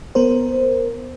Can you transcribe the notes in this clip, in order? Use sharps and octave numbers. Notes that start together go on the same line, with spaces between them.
B3 A#4 C5